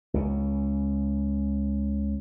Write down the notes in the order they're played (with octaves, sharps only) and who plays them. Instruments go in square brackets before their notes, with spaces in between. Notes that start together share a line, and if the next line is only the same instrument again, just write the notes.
[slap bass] C#2 C#3